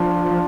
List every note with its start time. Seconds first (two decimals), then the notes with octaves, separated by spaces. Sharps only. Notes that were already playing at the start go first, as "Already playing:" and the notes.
Already playing: F3 D4 F4
0.31 F3